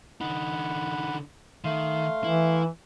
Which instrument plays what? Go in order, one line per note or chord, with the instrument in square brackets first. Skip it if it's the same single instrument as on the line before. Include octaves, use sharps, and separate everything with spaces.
[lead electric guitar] D3 D#4 [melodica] F#5 B5
[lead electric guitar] D#3 [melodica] A3 F5 C6
[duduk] E3 [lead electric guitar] E4